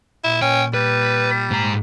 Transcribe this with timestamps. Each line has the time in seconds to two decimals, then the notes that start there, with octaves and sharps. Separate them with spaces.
0.24 A#2 E4
0.42 C#4 G5
0.74 G3 B4
1.51 G#2 A#5